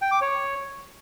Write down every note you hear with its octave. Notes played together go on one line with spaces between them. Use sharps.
G5
D6
C#5